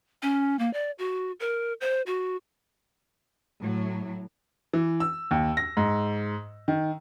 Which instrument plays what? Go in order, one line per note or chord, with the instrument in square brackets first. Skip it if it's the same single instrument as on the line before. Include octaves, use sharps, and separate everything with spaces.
[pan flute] C#4
A#3
D5
F#4
A#4
C5
F#4
[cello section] A2 F#3
[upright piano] E3
E6
D#2
A#6
G#2
D#3